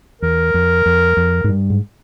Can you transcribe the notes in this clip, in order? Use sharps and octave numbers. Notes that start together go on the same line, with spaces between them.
E2 A#4
F2
F2
F2
G#2
G2
G#2